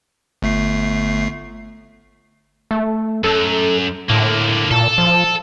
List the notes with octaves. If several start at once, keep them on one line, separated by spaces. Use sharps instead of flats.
G1 A3 C7
A3
F#2 A4
A2 D3 A#3
A#2 A4
F3